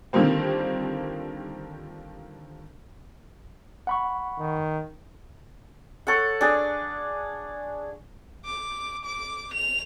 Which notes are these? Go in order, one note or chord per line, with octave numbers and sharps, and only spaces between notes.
D3 D#3 F3 G3 A#3 C4
F#5 B5 C#6
D#3
A4 C#5 F#5
D4 G#4
D6
D6
F7